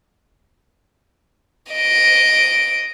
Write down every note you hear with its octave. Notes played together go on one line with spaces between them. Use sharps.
D#5 D7